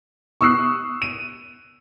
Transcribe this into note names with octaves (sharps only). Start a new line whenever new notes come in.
C#6 D#6 E6 F#6 C7
D#7